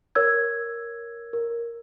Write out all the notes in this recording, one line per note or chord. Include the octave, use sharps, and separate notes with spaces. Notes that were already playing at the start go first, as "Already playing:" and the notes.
A#4 C#5 E6 G#6
A#4